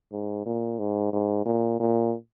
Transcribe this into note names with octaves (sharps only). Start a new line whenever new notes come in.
G#2
A#2
G#2
G#2
A#2
A#2